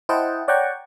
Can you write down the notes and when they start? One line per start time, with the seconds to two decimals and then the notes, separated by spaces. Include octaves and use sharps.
0.09 E4 C5 D#5 F#5 G5 A5
0.48 C#5 D5 F#5 G5 A#5 C#6